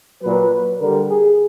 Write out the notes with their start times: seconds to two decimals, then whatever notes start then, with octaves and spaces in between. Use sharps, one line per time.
0.23 A#2 F#3 B4
0.79 D3 G3 A#4
1.08 G#4